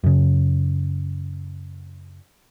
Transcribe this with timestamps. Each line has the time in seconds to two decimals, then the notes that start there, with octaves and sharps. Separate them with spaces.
0.04 F#2 C#3